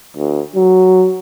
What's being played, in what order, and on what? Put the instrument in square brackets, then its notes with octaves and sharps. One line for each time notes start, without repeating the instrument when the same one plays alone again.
[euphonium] D2
F#3